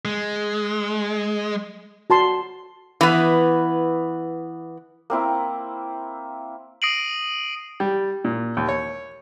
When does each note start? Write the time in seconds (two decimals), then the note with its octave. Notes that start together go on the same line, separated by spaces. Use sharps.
0.05 G#3
2.10 F#4 A5 C6
3.01 E3 B3
5.10 A#3 C4 E4
6.82 D#6 A#6 C7 D7 D#7 F#7
7.80 G3
8.25 A#2
8.57 D#2
8.69 C#5